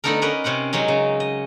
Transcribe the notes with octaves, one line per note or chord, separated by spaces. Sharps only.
D3 A3 B3 D#4 A4 A#4
C#4 D#4 A#4 B4 D5 D#5
C3 C#4 C5 F#5
F#3 G#3 C#4 D#4
C#3
D#5